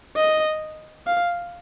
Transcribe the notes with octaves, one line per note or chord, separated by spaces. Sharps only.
D#5
F5